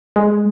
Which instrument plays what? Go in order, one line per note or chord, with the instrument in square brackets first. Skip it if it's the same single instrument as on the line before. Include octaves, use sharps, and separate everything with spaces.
[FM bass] G#3